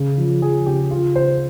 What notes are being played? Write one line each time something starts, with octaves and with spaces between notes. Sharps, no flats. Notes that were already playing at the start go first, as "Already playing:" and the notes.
Already playing: C#3
F3
F3 G#4
C#3 G4
C#3 F4
C#3 C5